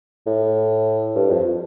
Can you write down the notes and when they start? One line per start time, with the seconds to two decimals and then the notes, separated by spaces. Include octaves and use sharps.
0.27 A2
1.16 G2
1.30 F2